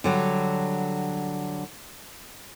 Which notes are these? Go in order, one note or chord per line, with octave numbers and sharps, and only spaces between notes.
D3 F#3 G3